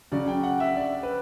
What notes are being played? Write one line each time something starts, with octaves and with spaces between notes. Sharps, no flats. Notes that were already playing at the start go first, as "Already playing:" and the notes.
C#3 F#3 C#4 D5
G5
F#5
E5
D5
B4